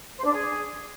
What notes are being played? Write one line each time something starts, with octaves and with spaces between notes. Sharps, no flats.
C5
D4
G#4